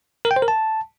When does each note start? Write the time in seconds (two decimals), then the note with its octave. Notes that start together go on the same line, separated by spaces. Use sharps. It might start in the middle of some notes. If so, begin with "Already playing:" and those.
0.25 A#4
0.31 G5
0.36 C5
0.42 A#4
0.48 A5